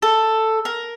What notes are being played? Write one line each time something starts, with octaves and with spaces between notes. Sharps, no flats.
A4
A#4